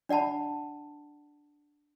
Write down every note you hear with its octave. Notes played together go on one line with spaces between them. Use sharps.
D4 D5 F#5 A5 B5